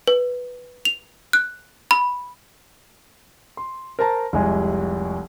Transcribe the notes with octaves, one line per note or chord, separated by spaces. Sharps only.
B4
F7
F#6
B5
C6
A#4 C5 A5 A#5
F1 C2 G#3 G#5